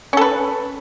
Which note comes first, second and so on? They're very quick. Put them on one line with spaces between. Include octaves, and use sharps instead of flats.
C#4 A4 B4